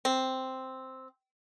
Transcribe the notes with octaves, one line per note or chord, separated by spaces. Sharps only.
C4